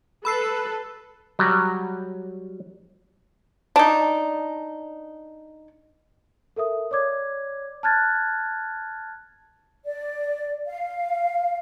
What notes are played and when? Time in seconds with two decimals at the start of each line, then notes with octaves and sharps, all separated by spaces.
0.25 A4 B4 B5 E6 C7
1.39 F#3 G3
3.76 D4 D#4
6.56 A4 A#4 E5 D#6
6.91 C#5 D5 D6 G#6
7.83 A5 F6 F#6 G#6 A6
9.86 D5
10.66 F5